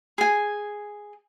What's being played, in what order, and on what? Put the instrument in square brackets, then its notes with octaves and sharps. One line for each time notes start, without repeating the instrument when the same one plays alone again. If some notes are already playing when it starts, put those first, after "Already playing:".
[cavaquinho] G#4 G#5